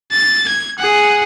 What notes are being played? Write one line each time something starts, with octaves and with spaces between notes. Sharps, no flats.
A6
G#6
G#4 F#5